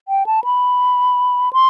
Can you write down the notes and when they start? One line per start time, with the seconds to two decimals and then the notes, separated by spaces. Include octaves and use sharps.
0.08 G5
0.27 A5
0.44 B5
1.53 C6